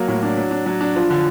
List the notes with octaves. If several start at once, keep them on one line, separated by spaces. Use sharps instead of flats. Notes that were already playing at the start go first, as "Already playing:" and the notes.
Already playing: F#3 A#3
A2
D4
F#3
D4
F#3
D4
F3
D3